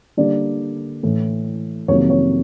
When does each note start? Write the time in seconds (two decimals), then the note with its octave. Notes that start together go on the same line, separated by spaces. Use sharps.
0.17 D3 G3 A#3 D4 D5
1.03 A2 E3 A3
1.88 F2 C3 D#3 F#3 A#3 C#5
2.10 C#5